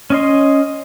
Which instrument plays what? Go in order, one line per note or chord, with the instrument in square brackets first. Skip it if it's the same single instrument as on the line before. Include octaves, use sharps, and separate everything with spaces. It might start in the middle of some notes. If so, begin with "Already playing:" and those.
[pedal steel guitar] C#4 D#5 C6